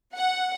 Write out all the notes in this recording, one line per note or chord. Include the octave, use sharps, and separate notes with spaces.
F#5